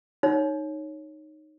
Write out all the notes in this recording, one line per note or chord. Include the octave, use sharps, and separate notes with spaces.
D#4 C#5